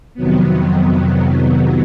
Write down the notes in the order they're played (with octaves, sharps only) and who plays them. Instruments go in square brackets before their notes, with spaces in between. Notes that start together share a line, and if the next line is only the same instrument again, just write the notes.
[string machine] F2 C3 D#3 F#3 B3